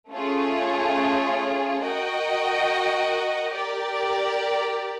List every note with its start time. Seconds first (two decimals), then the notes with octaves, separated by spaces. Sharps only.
0.11 A3 C#4 F4 G#4 C#5
1.81 F#4 A#4 D#5 G5
3.52 G4 A#4 D5